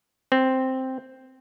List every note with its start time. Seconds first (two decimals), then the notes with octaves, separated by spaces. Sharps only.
0.32 C4